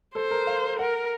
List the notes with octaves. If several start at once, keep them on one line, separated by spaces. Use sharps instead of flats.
A4 C5
A#4
F5
A#4 F#5